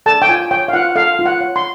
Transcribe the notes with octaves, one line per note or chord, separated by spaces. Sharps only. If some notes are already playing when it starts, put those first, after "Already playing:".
A4 A5
G5
F4 G#5
C#5 G5
F5
F4 F#5
A4 F5
F4
F#5
C#5
C6